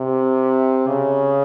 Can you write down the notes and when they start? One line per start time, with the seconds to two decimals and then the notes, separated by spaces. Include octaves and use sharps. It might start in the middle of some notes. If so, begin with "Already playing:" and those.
Already playing: C3
0.87 C#3